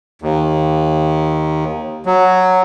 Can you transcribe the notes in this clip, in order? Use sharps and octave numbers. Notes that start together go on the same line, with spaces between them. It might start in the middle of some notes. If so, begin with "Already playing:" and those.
D#2
F#3